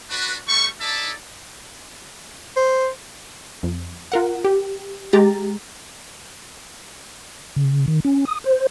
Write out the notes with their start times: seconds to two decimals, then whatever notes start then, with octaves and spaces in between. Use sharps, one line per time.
0.10 D4 F#4 B4
0.48 G3 A3 C#6
0.80 D#4 E4 A4 D5 E5 A5
2.56 C5
3.63 F2
4.12 F4 A#4 F#5
4.44 G4
5.13 G#3 G4 A#5 A6
7.56 C#3
7.88 D#3
8.05 C#4
8.25 D#6
8.44 C5